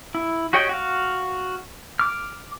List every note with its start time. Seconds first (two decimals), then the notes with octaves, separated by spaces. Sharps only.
0.15 E4
0.53 F#4 G4 C#5 D#5 G5
0.69 F#4 F5
1.99 D6 F6